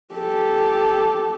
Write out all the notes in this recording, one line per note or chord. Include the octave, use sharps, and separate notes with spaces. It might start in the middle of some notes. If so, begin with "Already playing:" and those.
G4 A4